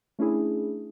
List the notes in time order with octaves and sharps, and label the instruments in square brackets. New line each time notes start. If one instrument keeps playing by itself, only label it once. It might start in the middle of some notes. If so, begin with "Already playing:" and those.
[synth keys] A3 C#4 D4 E4 G#4